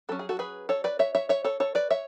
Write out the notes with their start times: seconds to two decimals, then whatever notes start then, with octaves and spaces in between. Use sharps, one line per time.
0.09 F#3 C#4 A4
0.19 G#4
0.29 F#4 A4
0.39 G#4 B4
0.69 A4 C#5
0.84 B4 D5
0.99 C#5 E5
1.15 C#5 E5
1.29 C#5 E5
1.44 A4 C#5
1.60 A4 C#5
1.75 B4 D5
1.90 C#5 E5